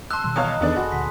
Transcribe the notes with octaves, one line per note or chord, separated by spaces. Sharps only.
A5 C6 E6 F#6
B2 D#3 G3
E2 C#5 D#5 F5 B5 D6 D#6
E2 D#3 E3 B3 D4 G#4 A4
F1 F#4 B4 D5 C6
D2 A#2 B6